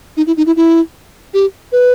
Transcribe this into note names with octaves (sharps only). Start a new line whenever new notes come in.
D#4
E4
D#4
E4
E4
G4
B4